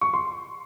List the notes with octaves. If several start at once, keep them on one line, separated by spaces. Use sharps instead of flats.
C#6
C6